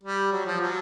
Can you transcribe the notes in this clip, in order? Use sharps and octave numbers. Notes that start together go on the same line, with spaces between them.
G3
F#3
F3
F#3